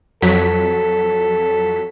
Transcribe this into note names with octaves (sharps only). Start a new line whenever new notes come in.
F2 F#3 A4 B6